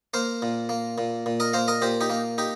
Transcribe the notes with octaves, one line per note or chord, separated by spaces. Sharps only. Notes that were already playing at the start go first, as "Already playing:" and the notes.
A#3 C5 F5
A#2
A#3
A#2
A#2
A#4 D#5
A#3 C5 F5
A#4 D#5
A#2 G4 C5
D#4 G4
A#3
D#4 G4